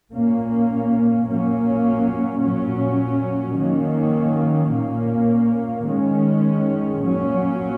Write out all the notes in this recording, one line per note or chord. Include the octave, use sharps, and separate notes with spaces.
A#2 A#3 C#4
A#2 F#3 A#3 C#4
A#2 F#3 C#4
D#3 F#3 A#3 C#4
A#2 A#3 C#4
D#3 G#3 C#4
A#2 F#3 C#4